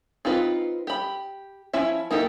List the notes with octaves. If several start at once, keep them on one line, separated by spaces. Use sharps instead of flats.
C4 D#4 F4 B4
G4 B5
F3 C#4 E4 E5
A#3 D#4 E4 G4 A4